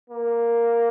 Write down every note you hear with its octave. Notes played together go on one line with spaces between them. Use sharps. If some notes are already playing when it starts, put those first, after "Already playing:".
A#3